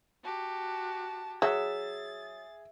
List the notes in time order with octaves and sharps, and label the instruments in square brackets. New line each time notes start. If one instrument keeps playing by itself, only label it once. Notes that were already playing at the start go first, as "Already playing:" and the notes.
[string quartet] F#4 G4 A5
[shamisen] F#3 [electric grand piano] G#4 [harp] E5 [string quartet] A6